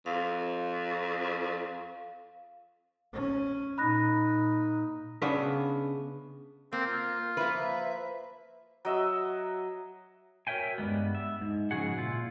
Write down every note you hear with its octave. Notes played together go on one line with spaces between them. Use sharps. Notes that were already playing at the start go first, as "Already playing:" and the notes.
F2 F5
C#4
A#2 D#4 B5 F#6 A#6
C#3 B3 D4 E5
A#3 C4
F4
F3 A#3 B4 E5
F#3 D#5 E5
F#4 A#4 C#5 E5 G5 G#5
G2 G3 G#3 B3
E5
G#2
G#2 C#3 F3 F#4 G#4 F#5
A#2 E4 F4